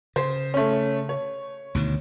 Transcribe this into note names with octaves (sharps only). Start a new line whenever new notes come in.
C#3 C5
A3 C#4
C#5
D2 B2 D#3